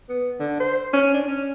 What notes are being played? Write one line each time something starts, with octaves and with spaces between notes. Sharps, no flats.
B3
D3
C5
C#4
D4
C#4